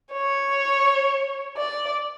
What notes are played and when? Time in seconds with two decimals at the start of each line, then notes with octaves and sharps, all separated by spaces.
0.13 C#5
1.57 D5